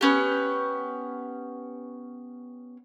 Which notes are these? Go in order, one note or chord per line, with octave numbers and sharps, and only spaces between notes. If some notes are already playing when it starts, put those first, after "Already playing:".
B3 C#4 G4